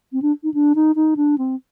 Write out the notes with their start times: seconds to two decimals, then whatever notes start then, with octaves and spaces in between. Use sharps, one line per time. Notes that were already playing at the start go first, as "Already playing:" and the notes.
0.12 C4
0.22 D4
0.43 D#4
0.54 D4
0.75 D#4
0.95 D#4
1.16 D4
1.38 C4